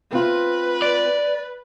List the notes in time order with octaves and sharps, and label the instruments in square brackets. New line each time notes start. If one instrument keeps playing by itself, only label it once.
[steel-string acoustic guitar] C4 F4 [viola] B4
[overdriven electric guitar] D5